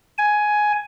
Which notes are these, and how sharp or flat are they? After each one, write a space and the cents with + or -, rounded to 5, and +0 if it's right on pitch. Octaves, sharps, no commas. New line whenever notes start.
G#5 +10